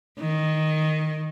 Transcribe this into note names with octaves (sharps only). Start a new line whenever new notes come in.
D#3